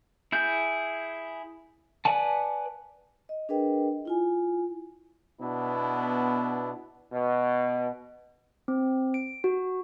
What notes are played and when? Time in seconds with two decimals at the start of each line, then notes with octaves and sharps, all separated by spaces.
0.32 E4 G#4 G6
2.05 B4 D5 F#5 G#5 A5
3.29 D#5
3.49 D4 G#4 A#4 B4 D#5 G5
4.05 E4 F4 G#5
5.40 B2 B3 D4 E4
7.12 B2
8.68 C4
9.14 D7
9.44 F#4